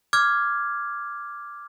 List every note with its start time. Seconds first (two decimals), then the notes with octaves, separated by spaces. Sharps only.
0.13 D6 F6 G#6